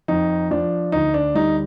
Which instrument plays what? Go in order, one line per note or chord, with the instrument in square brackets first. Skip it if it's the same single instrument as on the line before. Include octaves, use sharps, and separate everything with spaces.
[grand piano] F2 D#4
F3 D4
D2 D#4
D4
G3 D#4